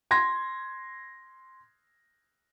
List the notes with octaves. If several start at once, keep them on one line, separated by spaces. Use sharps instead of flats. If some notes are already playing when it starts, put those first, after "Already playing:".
C6 G#6 A#6